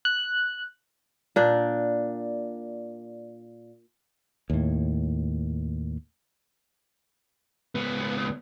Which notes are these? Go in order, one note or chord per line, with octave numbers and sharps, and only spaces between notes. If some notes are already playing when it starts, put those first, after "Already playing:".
F#6
A#2 D4
D#2 A2
C#2 B3